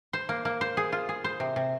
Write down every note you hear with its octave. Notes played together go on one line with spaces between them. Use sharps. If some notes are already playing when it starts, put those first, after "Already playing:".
C5
A#3
A#3
C5
G#4
F4
G#4
C5
C3
C3